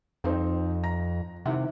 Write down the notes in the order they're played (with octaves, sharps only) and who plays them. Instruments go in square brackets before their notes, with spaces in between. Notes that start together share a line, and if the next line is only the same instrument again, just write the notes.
[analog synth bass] F2 [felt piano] C4 D#4 C5
[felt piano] A#5 A#6
[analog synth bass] C3 [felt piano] D#3 E4 F#5